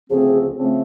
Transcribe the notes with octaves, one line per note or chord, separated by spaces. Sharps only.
D2 C#3 F3 A3 C4 G#4
C#3 F3 A3 C4